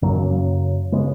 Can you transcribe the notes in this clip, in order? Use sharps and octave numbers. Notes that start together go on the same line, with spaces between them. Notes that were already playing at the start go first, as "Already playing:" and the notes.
F#2 C#3 F#3 A#3
C#3 G#3 B3